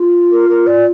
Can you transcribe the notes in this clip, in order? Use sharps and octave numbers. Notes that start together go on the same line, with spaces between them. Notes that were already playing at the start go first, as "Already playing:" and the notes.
Already playing: F4
A#4
A#4
D5